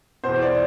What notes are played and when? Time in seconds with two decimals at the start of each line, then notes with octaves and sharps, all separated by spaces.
0.24 E2 B2 C5
0.42 D5